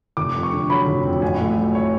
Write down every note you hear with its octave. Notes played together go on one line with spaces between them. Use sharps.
F1 D6
F2
C#6
D3
F#3 B5
F1
F2
A1 G#5
A2
F#3
C#5